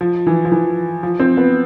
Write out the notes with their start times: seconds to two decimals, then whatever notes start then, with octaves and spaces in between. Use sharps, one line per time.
0.01 F3
0.27 E3
0.45 F3
0.52 E3
1.03 F3
1.20 C4
1.37 B3